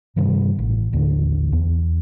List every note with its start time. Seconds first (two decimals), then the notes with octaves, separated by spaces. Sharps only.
0.16 G2 C3 D#3 G3
0.59 A1
0.93 A1 D#2 D3
1.53 E2